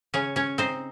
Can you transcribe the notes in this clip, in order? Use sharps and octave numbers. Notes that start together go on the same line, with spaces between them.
C#3 C#4 C#5
C#4 C#5
C4 D#4 C5